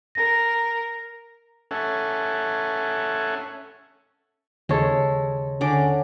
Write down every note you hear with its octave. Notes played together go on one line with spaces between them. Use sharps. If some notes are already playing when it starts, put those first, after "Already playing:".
A#4 A#6
C#4 A4 E5 F#5 G#5
D#2 C#3 G#3 A4 C#5
D3 C#4 D6